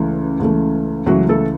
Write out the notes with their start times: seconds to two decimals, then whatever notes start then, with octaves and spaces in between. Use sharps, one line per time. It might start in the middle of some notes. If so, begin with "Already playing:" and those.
Already playing: C#2 C#3 E3 A3
0.40 C#2 C#3 E3 A3
1.06 C#2 C#3 E3 F#3 A3 F#4
1.29 A3 A4